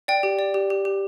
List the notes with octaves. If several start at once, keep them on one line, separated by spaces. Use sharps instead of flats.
D5 G5
G4
D5
G4
G4
G4